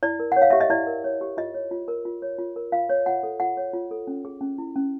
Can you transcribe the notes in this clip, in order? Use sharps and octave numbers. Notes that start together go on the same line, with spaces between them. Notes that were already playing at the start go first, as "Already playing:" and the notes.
E4 D5
A#4
F#5
C#5
F5
G4 E5
D#5
E4 D5
A#4
C#5
G4
F4 D#5
C#5
F4
A#4
F4
C#5
F4
A#4
F4 F5
C#5
F4 F#5
A4
F4 F#5
C#5
F4
A4
C#4
G#4
C#4
E4
C#4